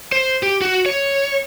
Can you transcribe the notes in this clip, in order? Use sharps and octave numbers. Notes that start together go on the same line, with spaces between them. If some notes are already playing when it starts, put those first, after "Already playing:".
C5
G4
F#4
C#5